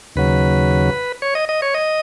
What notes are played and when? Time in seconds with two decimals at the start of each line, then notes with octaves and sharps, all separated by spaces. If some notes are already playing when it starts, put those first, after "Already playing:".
0.16 D#2 C#3 F#3 B4
1.22 C#5
1.35 D#5
1.49 D#5
1.62 C#5
1.74 D#5